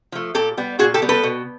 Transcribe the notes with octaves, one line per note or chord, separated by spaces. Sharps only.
F3 A3
A#2 G4 A4
G3 B3
A#2 F#4 G#4
G4 A4
G3 B3
A4 B4
B2